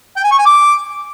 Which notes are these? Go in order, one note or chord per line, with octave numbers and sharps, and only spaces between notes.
G5
G#5
C#6
G#5
D6